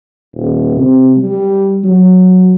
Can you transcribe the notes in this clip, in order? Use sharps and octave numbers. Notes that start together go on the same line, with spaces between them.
D#1
C3
G3
F#3